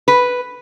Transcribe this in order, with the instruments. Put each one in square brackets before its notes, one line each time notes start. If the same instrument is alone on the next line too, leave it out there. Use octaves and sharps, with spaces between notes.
[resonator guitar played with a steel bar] B4